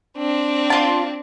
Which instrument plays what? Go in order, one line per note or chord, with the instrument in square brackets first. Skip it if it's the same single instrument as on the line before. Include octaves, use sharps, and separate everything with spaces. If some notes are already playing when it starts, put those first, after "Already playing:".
[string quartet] C4 D4
[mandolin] F4 A5